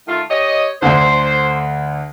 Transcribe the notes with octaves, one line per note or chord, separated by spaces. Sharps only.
D#3 A3 F4
G4 C#5 D#5
D2 D3 C5